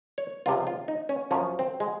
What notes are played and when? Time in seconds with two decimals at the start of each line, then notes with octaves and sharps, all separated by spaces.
0.18 C#5
0.46 C#2 C3 F3 F4
0.67 F4
0.88 D#4
1.09 C#4
1.31 F#2 F3 C#4
1.59 C4
1.80 G#3